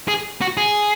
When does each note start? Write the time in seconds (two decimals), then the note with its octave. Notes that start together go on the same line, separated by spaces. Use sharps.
0.08 G#4
0.41 F#4
0.57 G#4